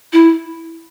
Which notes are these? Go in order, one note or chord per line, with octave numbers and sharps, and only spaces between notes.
E4